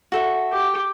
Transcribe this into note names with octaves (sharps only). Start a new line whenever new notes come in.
F#4 A4 E5
G4